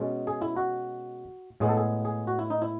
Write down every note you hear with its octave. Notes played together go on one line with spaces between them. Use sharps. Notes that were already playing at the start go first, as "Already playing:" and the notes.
Already playing: B2 G#3 C#4
G#4
E4
F#4
A2 G#3 B3 G#4
A4
G#4
G#4
F#4
E4
D#4
E4